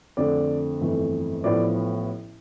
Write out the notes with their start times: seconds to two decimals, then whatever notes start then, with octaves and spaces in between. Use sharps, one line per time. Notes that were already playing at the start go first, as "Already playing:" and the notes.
0.17 F2 D3 A3 D5
0.81 G1 F2 E3 A3
1.44 A1 A2 F3 B3 D5